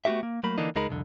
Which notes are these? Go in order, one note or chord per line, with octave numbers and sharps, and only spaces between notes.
A3 B3 D4 F#4 G4 E5
A#3
F#3 A3 A#3 B5
D3 E3 A#3 D4 D#4
C#2 G#3 D#4 A#4 B5
C2 F2 D3